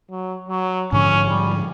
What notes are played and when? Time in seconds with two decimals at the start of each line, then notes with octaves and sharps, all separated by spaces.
0.10 F#3
0.49 F#3
0.92 G#2 D3 F3 C#4
1.29 G3